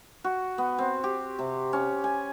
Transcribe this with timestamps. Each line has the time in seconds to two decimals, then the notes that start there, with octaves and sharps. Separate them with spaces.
0.24 F#4
0.58 B3
0.78 C4
1.04 G4
1.39 C3
1.73 C#4
2.04 G#5